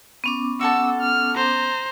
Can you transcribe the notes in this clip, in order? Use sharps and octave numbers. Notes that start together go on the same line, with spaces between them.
B3 C#4 D6
F#4 A4 A5 E6
F6
C5 A#5